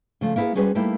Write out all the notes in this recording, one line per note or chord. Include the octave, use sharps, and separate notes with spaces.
C#3 F3 A3
A#3 B3 E4 G4 G#4 B4
G3 C#4 F#4 G#4 B4 C5
G3 A3 A#3 D#4 E4 G4